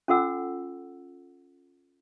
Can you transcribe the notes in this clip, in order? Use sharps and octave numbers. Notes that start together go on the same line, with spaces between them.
C#4 F4 A4 F#5 E6